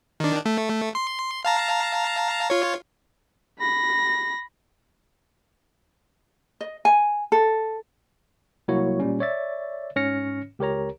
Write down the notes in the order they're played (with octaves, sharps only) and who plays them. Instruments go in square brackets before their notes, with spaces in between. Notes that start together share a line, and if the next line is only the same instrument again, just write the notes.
[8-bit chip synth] D#3 D4
A3
C6
F5 A5 A#5
F4 C#5
[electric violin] B5 A#6
[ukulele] D#5
G#5
A4
[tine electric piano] C2 F#3 A#3 E4 F#4 C#5
A#2 G3 C#4
C#5 D5 E5 A6
G#2 C#4 C#5 F6 A#6 C#7
C#2 G4 A#4 C#5 A#5